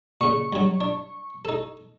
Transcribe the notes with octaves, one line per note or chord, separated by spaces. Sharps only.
A#2 C#3 C#6
G2 F#3
D4
D#4 A4